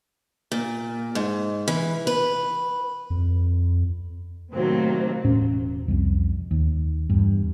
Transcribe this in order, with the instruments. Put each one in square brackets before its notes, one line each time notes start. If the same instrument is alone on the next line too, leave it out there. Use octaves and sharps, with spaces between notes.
[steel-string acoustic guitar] A#2
G#2
E3
B4
[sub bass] F2
[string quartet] A2 C3 D#3 F#3 A#3 C4
[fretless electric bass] E1 A2 C#4
C2 F2
D#2
E2 G2